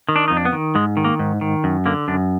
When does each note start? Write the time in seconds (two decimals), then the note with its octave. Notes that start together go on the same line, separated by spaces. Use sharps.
0.08 D#3
0.16 D4
0.28 F2 D#4
0.37 D4
0.45 B3
0.53 D#3
0.75 G#2 G#3
0.97 D#3
1.05 A#3
1.19 G#2
1.41 D#3
1.64 F#2
1.86 D3 A#3
2.08 F#2 D4